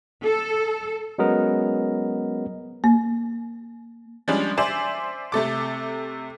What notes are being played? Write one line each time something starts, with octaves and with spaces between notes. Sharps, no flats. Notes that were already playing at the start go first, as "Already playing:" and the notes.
A4
F#3 G#3 B3 C#4 A#4 D#5
A#3
F3 G3 G#3 C#4 D4
C5 D5 E5 G#5
C3 A3 A4 D6